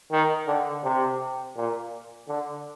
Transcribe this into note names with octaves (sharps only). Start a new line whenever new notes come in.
D#3
D3
C3
A#2
D3